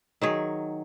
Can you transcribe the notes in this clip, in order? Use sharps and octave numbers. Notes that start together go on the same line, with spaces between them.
D#3 F#3 G#4